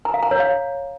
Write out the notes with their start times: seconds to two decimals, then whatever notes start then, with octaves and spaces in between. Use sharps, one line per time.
0.05 A#5
0.14 F5
0.23 A#5
0.31 C#5
0.40 F5